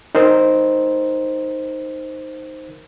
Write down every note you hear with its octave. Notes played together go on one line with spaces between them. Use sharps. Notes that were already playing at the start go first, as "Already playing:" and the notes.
D#4 A#4 C5